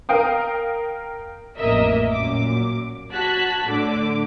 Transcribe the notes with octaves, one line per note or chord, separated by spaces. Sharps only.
A#4 F5 G5 D#6
A1 F2 A#3 A#4 D#5 E5
F#2 A#2 D6
F#4 A5 F#6 G#6 B6
A2 D3 D6